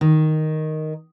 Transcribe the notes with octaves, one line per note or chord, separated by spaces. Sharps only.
D#3